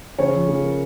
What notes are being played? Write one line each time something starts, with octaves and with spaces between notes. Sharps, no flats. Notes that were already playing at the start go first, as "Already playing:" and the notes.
C#3 C#5
F3
C#3
A#3